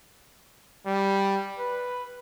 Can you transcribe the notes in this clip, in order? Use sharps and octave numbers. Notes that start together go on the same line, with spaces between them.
G3
B4